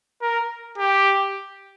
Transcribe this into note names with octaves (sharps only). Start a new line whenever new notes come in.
A#4
G4